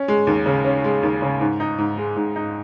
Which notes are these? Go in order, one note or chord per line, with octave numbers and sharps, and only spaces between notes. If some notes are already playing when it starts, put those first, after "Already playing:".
Already playing: C#4
G#3
D#2
C#3
C#4
G#3
D#2
C#3
G#2
D#4
G#2
G#3
G#2
D#4